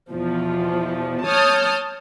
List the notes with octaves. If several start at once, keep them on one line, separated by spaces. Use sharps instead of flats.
E2 B2 F3
C#5 A5 D#6 F6 G6